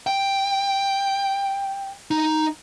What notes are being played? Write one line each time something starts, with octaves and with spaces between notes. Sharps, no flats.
G5
D#4